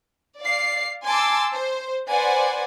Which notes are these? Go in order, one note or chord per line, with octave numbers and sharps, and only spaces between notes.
D5 F5 C7
G#5 A5 C6 D6 E6
C5
B4 C5 D5 F#5 G#5